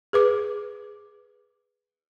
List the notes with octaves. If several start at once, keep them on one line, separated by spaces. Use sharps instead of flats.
G#4 B4 D6